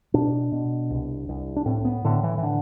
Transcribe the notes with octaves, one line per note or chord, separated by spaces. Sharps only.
B2 D4
B2
C2
C2
D4
A2 C4
B3
A2 D3
E3
E3
D3